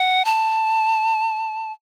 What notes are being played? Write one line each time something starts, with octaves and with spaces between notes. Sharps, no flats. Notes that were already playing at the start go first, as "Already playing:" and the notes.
Already playing: F#5
A5